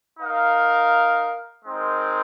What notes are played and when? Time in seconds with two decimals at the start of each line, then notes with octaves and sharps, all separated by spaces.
0.19 D#4 A#4 F5
1.65 G#3 C4 D#4 A#4